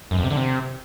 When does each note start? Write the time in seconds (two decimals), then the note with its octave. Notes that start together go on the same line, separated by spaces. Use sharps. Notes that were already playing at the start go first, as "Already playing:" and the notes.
0.11 F#2
0.18 F2
0.24 C3
0.30 D3
0.37 C3